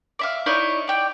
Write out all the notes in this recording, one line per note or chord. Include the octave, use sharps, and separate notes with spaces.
D5 E5 F5
D#4 E4 C#5 D5
D5 G5